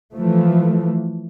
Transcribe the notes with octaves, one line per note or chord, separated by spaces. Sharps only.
E3 F3 A3